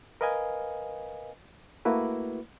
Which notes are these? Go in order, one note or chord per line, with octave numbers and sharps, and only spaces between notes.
A#4 B4 D#5 F5 G#5
A3 A#3 E4 F#4 B4